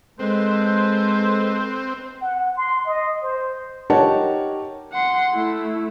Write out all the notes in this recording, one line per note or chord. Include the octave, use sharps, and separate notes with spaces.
G#3 C4 A4 B4 C5
F#5
C6
D#5
C5
D#4 G4 A#4 C#5 F#5 A5
F#5 C6
A3 E4